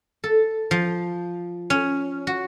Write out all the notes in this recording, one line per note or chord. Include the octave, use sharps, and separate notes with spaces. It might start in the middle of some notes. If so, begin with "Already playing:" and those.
A4
F3
C#4
F#4